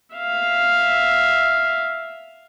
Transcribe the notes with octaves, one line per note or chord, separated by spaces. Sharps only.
E5 F5